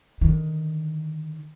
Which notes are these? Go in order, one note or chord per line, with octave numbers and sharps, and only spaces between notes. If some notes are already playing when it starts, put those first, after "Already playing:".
D3 D#3